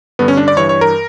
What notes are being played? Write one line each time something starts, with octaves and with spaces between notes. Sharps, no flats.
G2 D3 B3
C#4
D4
D5
G2 E3 C#5
C#5
A#4